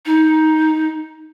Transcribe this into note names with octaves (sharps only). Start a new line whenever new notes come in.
D#4